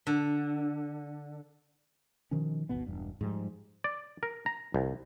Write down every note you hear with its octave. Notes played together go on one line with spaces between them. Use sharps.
D3
B2 D#3 F3 C#4
D#1 G#1 B2 B3
E1 G2
G#2 F3 G3
D5
A#4
A#5
C2